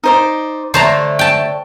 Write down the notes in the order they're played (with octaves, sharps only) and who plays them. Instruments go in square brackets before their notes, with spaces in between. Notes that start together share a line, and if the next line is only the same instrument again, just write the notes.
[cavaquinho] D#4 C5 D5
[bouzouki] D3 A3 [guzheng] C5 A5 A#5 [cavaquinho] C#5
[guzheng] G5 A5